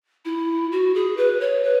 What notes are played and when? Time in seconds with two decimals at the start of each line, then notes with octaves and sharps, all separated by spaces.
0.25 E4
0.72 F#4
0.95 G#4
1.17 B4
1.40 C#5
1.64 B4